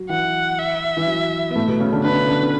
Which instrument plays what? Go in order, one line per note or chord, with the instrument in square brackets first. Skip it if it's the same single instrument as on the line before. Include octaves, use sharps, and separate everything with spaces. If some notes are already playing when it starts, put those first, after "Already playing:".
Already playing: [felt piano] F#3
[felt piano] E3 [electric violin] F#5
[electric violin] E5
[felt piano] E3
F#3
B3
A2 A3
B2 B3
C#3 C#4
D3 D4
[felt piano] D3 D4 [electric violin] B4
[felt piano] D3 D4